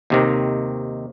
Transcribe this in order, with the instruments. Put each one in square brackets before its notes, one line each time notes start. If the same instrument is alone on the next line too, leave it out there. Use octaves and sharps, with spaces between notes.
[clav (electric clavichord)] D#2 C3 D#3